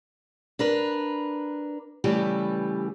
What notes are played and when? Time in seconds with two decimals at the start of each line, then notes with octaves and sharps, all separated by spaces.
0.59 D4 A#4 B4
2.04 C#3 E3 G3 A3 G4 B4